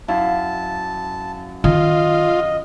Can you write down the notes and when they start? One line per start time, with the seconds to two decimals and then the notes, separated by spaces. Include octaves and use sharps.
0.08 F#2 E4 F5 A5
1.64 D#3 F4 D#5